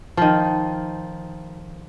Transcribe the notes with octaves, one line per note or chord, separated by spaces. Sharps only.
D#3 F3